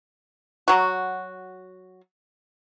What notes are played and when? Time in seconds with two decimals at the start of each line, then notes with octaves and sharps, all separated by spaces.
0.68 F#3 F#4